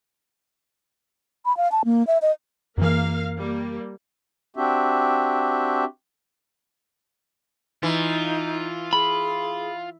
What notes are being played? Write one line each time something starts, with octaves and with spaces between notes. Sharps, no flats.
B5
F5
A5
A#3
E5
D#5
F#2 E3 A#3 A#4 F5
G3 A#3
C4 D4 F#4 G4 E5
E3 D#4 F4
G#4 B5